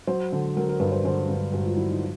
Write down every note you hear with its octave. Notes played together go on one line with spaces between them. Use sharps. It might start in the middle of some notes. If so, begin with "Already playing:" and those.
F#3 C5
D3
F#3 A#4
A#4
G2 B4
C5
D3 C5
G2
G2 F#4
F4
F#3 E4
D#4